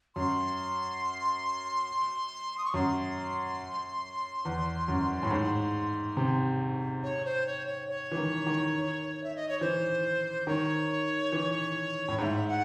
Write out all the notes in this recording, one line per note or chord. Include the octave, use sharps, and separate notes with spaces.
F#2 C6
D#6
C#6
F#2 C6
E2
F#2
A2
G#2
C3
C#5
C5
C#5
C#5
C#5
E3
D#3
D#3
E5
D#5
C#5
E3 C5
D#3 C#5
E3
A2
G#2 F#5
E5
F#5